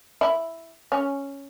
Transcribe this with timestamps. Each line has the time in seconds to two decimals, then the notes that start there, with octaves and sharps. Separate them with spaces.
0.21 E4
0.92 C#4